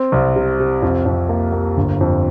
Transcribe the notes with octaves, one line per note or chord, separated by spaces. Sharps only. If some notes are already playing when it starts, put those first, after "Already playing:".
Already playing: C4
C2
C3
C3
F2
F2
A#3
A#3
G1
F2